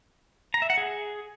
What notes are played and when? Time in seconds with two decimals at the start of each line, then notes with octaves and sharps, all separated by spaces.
0.54 A#5
0.62 E5
0.70 F#5
0.78 G#4